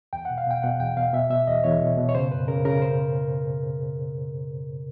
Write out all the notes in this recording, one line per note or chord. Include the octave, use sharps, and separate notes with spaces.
E2 G5
B2 F#5
F5
B2 G5
B2 F#5
E2 G5
B2 F5
B2 E5
B2 E5
E2 D#5
E2 C#5
B2
B2
C#5
C#3 C5
F#2 B4
C#3 A#4
C#3 A#4
C5